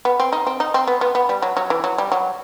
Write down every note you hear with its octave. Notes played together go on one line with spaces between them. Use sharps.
B3
C4
D#4
C4
D#4
C4
B3
B3
B3
G3
F#3
F#3
E3
F#3
G3
F#3